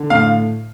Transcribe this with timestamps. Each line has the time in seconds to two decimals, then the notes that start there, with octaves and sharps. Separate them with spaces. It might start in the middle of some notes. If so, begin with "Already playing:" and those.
Already playing: D3
0.10 A2 F5